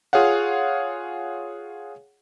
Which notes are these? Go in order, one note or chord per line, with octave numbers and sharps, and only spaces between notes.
F4 G#4 C#5 F5 F#5